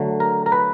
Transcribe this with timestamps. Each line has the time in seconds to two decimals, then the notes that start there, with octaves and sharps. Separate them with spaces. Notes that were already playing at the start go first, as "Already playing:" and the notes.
Already playing: D3 F#3 A3
0.20 A#4
0.46 A#4
0.52 B4